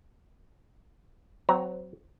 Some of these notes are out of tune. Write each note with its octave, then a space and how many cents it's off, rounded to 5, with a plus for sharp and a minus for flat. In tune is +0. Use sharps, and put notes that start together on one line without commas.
F#3 +0 C4 -25 A#5 +0